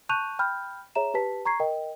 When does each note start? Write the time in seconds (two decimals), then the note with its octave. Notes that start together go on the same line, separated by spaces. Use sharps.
0.09 A5 C#6 F#6 G6 D#7 F7
0.39 G5 B5 F6 G6
0.95 G#4 C#5 E5 A#5 E7
1.14 G4 B4 A5 B6
1.45 A#5 C#6 G#6 C7
1.60 A#4 D#5 G5